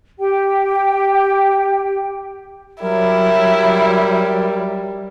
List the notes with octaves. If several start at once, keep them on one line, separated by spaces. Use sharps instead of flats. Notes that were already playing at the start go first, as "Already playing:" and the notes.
G4 G5
F#3 G3 E4 A#4